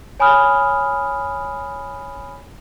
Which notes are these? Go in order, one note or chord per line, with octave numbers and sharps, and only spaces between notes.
C#5 G#5 B5 D#6 F6